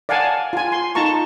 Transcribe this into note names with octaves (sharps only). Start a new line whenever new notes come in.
D5 F5 F#5 G#5 A5
F4 G#5
C6
D#4 F4 A5 A#5 C#6